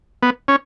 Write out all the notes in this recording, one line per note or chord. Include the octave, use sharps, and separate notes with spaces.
B3
C#4